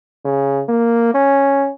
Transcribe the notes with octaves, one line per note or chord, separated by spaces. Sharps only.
C#3
A#3
C#4